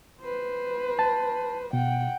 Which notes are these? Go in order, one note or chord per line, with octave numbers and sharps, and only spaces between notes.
B4 C5
A5
B2 F#5 G5